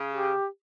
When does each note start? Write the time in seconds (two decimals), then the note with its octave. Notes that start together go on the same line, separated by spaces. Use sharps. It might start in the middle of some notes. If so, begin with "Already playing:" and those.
Already playing: C#3
0.13 G4